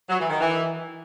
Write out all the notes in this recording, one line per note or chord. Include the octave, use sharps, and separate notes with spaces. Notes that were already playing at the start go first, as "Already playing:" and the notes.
F#3
E3
D#3
E3